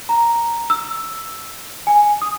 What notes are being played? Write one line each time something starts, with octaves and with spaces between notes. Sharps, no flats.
A#5
E6
G#5
D#6